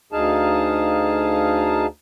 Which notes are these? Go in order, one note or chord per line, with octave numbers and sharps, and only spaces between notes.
D2 D#4 G#4 F5 A5